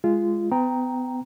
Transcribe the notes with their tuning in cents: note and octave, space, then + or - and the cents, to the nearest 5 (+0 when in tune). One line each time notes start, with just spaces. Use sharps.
G#3 +0 F4 -20
B3 +35 G5 +0 A#5 +0